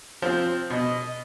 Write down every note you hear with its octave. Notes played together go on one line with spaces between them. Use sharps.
F3 C4
B2 D#5